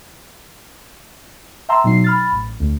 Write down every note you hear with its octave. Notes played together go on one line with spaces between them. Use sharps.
E5 G5 A5 A#5 C6 E6
B2 F#3 D#4 C7
B5 F6 A6
A1
D2